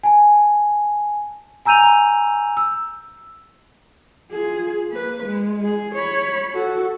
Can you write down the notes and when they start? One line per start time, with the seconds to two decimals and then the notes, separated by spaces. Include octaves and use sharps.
0.03 G#5 A5
1.65 G#5 A#5 E6 G6 D#7 F7
2.57 E6
4.31 F4 G#4
4.90 A#3 B4
5.25 G#3
5.64 G#4
5.95 C#5 B5
6.54 F#4 A4